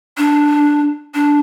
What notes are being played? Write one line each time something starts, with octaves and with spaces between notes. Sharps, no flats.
D4
D4